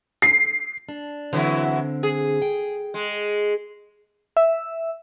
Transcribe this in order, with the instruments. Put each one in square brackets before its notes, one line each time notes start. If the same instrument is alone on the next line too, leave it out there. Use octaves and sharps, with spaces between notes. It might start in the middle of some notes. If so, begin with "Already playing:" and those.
[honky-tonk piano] C7
[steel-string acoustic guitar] D4
[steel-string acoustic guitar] D3 C4 [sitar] E3 F#3 E4
[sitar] G#4
[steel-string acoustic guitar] G5
[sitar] G#3
[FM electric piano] E5